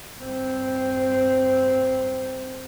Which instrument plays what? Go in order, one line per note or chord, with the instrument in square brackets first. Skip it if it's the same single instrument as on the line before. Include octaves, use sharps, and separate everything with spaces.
[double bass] G2 C4